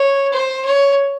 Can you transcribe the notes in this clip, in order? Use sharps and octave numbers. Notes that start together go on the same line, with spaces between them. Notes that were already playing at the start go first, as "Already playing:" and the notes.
Already playing: C#5
C5
C#5